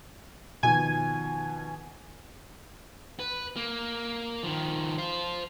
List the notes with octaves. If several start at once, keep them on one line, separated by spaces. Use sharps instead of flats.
B2 D#3 F3 G#5 G#6
B4
A#3
D#3 F3
C5 F5